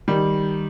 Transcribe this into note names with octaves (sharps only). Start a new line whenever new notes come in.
D#3 G3